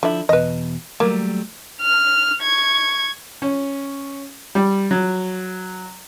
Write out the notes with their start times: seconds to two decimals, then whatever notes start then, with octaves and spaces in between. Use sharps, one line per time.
0.03 D3 F3 E4 E5
0.29 E2 B2 B4 D#5
1.00 F#3 G3 A3 A#3
1.82 F6
2.42 C#6 G#6
3.42 C#4
4.55 G3
4.91 F#3